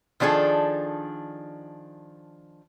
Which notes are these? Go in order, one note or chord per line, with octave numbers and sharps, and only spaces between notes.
D#3 F3 D4 G#4 A4